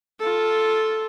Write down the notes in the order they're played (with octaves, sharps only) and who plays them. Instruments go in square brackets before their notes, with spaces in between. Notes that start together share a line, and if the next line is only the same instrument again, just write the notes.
[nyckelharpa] F4 A4